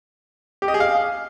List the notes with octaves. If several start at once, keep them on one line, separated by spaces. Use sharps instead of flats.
G4
D#5
G#4
F5